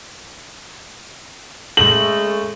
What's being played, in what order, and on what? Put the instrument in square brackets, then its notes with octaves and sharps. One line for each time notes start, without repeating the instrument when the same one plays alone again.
[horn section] C#3 G#3 A3 [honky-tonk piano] F#7